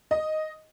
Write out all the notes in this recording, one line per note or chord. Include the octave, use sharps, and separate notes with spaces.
D#5